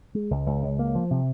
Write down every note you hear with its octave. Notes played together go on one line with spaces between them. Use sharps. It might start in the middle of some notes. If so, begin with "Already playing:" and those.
G#3
C#2
C#2
C#2
A#3
F3
C3